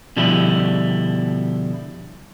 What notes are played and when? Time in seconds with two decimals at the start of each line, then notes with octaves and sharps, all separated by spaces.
0.16 B2 D3 F3 G3 E4